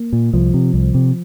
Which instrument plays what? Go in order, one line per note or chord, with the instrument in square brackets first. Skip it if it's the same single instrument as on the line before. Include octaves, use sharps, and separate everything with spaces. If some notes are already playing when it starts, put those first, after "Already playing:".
Already playing: [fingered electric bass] A#3
A#2
C2 F3
C3
C2
C3